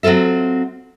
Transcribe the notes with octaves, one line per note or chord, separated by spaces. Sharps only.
F#3 C4 F4 A4 E5